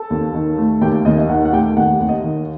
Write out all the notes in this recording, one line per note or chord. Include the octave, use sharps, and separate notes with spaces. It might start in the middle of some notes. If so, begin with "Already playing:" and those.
Already playing: A4 A5
D#2
D#3
A3
D#2 G4 G5
D#2 D#5
D#5
D#3 F#5
F#5
A3 G4 G5
D#2 F#5
D#2
D#5
D#3